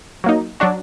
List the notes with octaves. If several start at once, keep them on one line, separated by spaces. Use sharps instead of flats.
F#3 A#3 D#4
F#3 D4 F#4